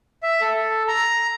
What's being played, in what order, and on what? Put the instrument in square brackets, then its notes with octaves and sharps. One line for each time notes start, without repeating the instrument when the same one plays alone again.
[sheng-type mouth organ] E5
A4
A#5